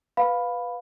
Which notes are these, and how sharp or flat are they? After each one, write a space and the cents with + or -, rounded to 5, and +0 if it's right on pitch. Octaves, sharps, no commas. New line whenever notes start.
B4 +0 F5 +15 B5 +0